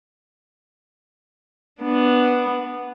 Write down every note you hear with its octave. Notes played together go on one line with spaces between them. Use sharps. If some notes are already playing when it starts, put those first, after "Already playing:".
B3 D4